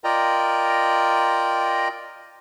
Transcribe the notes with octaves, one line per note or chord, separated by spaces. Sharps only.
F4 A#4 D5 D#5 G5 A#5